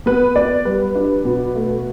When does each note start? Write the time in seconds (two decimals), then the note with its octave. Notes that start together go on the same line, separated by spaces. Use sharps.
0.06 B3 B4
0.36 B3 D5
0.65 G3 B4
0.95 D4
1.25 B2
1.55 A3